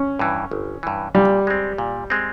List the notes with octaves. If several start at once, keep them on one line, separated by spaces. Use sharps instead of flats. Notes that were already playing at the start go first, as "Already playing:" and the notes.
Already playing: C#4
G2 E3
G1
G2 E3
A#2 G3
G#3 C4
A#2
G#3 C4